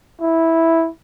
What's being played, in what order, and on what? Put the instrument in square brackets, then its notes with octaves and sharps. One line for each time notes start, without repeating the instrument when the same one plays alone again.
[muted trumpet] E4